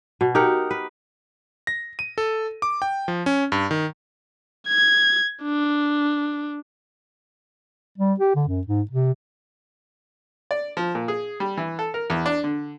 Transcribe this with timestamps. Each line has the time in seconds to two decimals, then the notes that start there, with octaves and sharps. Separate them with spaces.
0.21 B2
0.35 D#4 G4 A#4 F#5
0.71 B4
1.67 A#6
1.99 D#7
2.18 A4
2.62 D6
2.82 G5
3.08 F3
3.26 C#4
3.52 G2
3.71 D#3
4.68 G#6
5.43 D4
7.98 G3
8.20 G4
8.36 D3
8.48 F#2
8.67 G#2
8.91 C3
10.51 D5
10.77 F3
10.95 A#2
11.08 G#4
11.40 G3
11.57 E3
11.79 A4
11.94 A#4
12.10 E2
12.26 D4
12.44 D3